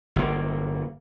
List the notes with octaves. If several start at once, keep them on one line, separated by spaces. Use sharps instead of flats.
G1 A#3